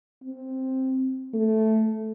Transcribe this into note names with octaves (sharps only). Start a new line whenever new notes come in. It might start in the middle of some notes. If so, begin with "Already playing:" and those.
C4
A3